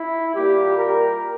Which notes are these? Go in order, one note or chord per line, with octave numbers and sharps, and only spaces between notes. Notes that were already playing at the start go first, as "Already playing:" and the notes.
Already playing: E4
A#2 G3 A#3 G4
A#4